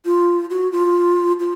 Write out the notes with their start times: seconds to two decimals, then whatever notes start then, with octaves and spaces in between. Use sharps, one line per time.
0.05 F4
0.50 F#4
0.72 F4
1.40 F4